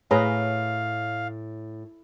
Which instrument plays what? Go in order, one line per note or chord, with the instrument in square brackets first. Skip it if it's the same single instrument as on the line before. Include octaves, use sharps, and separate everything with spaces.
[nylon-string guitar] A2 [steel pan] G#4 B4 A#5 [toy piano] C#5 [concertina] F5